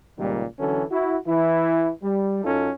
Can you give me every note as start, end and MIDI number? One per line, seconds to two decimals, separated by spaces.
0.18 0.44 37
0.18 0.44 46
0.18 0.44 51
0.18 0.44 55
0.59 0.83 50
0.59 0.83 52
0.59 0.83 54
0.59 0.83 61
0.59 0.83 69
0.91 1.16 64
0.91 1.16 66
1.26 1.90 52
1.26 1.90 64
2.03 2.42 55
2.44 2.70 42
2.44 2.70 61
2.44 2.70 63
2.44 2.70 65
2.44 2.70 69